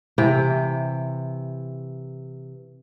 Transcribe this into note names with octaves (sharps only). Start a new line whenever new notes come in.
C3 E3 G5